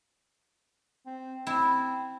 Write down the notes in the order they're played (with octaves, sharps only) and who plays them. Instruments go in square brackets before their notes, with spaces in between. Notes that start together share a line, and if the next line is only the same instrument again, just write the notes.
[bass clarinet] C4
[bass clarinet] C4 [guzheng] E4